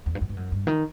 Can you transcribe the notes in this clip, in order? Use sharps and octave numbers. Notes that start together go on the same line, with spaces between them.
E2
G2
F#2
G2
F#2
G2
D#3